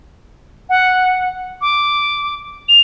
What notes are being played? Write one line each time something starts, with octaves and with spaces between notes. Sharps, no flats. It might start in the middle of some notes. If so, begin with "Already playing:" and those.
F#5
D6
F7